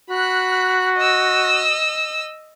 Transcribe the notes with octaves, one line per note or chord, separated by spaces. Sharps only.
F#4 B5 F#6
D#5 E6